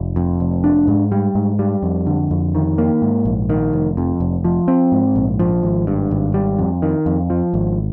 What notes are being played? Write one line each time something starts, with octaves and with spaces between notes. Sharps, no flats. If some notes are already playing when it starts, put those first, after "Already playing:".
Already playing: F1
F2
F1
D4
G#2
G3
G#2
G3
F2
D3
F2
D#3
A#3
G#2
A#1
D#3
F1
F2
F1
F3
C4
G#2
A#1
F3
G#1
G2
G#1
G3
F2
D#3
F2
F3
G#1